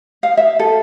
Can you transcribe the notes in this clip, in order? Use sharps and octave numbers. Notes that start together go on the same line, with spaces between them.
F5
E5
A4